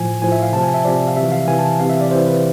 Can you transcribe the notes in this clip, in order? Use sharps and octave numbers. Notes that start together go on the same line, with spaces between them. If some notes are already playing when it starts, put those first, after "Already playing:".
Already playing: A2 F3 G#5
A2 F3 G#5
E5
F5
C3 F3 A5
G#5
E5
C3 F3 D5
F5
C3 E3 E5
F5
C3 E3 G#5
A5
C3 E3 F5
E5
D5
C3 E3 C5
B4